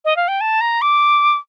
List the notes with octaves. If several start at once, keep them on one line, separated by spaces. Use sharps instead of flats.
D#5
F5
G5
A5
A#5
D6